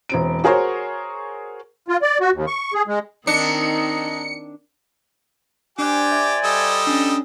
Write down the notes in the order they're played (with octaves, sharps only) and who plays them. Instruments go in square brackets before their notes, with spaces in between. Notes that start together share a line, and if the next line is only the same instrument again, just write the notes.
[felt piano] E1 C4 D7
F#4 G#4 A#4 C5 C#5
[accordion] F4
D5
F#4
D#2
C#6
G#4
G#3
[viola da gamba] D#3 C4 [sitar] D4 [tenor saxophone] D#4 [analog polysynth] C#7
[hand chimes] D4 F#6 [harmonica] G4 D6 [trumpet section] C5 D5 G#5
[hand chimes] E5
[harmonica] G3 A4 D#5
[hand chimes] C#4 D4